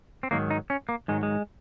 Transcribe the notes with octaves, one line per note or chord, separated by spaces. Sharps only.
C4
G#2 D#3 F#3 A#3
D#4
C#4
A#3
G#2 D#3 F#3 G#3
G#3